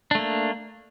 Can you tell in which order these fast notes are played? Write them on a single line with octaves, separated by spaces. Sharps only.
D4 A3 A#3